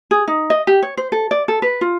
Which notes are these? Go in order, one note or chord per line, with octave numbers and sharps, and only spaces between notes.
G#4
D#4
D#5
G4
C#5
C5
A4
D5
A4
B4
F4